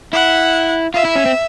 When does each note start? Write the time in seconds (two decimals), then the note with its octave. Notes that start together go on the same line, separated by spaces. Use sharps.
0.13 E4 F#5
0.94 F4 E5
1.05 E4
1.15 C#4
1.26 C4